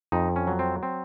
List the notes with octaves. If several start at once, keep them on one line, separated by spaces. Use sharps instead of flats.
F2 D#4
C#4
F#3
C4
C4